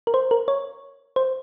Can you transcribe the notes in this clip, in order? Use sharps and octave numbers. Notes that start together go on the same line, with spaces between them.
A#4
C5
A#4
C#5
C5